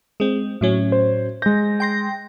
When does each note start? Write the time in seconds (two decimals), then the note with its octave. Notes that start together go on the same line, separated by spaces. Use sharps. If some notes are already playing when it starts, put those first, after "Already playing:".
0.20 G#3 C4
0.61 A2 F#3 C#4
0.92 C5
1.42 G#3 G6 A#6
1.80 G5 C6 A#6